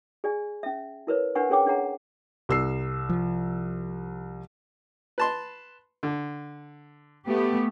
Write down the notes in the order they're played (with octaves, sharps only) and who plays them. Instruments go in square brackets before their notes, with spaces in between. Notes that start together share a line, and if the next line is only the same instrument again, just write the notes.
[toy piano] G#4 D5 G#5
C#4 E5
E4 A#4 B4 C#5
D4 A#4 B4 F#5 G#5 C#6
C#4 G#4 A#4 C#5 G5 D6
C#4 D4 G#4 C#5 F#5 A#5
[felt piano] C2 E6 C7
[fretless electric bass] F3
[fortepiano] B4 A5 C6
D3
[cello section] A3 B3 G4